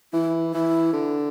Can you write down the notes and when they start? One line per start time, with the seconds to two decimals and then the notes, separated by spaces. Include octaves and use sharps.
0.13 E3 E4
0.54 E3 E4
0.93 D3